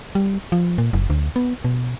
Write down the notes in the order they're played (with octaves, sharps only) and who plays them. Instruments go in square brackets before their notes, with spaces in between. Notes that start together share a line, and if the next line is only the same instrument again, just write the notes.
[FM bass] G3
F3
A#2
F#1
D2
B3
B2